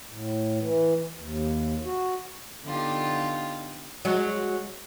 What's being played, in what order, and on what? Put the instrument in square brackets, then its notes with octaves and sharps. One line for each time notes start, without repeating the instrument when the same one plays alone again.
[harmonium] A2
E3
D#2
F#4
[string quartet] D3 B3 D#4 F4 G4
[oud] F#3 G#3